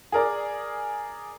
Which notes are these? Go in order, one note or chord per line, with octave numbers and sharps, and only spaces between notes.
G#4 A#4 D5